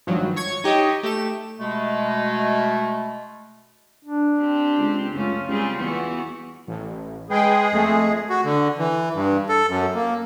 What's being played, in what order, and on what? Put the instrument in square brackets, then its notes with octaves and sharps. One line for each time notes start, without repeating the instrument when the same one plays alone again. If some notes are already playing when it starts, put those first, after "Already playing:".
[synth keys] G#1 G2 F3 F#3
C#5 C#6 G#6
D#4 G4 C#5 D#5
A3 G4 A4 E7
[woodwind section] B2 G#3 A3
[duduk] D4
[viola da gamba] C4 G4
[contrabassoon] C#2
[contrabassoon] C#2 [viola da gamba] F#2 A3 C#4 [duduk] F4
[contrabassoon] C#2 [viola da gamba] G3 C4 G#4
[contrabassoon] E2 [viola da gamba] E3 B3 F#4
[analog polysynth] A1
[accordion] G#3 G#4 [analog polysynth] B4 G5 G#5
[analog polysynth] F2 A3
[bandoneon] F#4
D3
E3
G2
A4
F#2
A#3